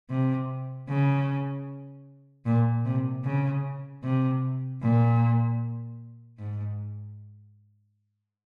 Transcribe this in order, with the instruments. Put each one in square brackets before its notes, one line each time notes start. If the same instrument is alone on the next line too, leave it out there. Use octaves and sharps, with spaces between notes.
[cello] C3
C#3
A#2
C3
C#3
C3
A#2
G#2